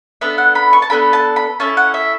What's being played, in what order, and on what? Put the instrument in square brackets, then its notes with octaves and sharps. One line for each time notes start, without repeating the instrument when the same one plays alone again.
[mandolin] B3 D4 A4 E5
F#5
B5
C#6
A5
B3 D4 A4 B5
A5
B5
C#4 E4 A4 A5
F#5
E5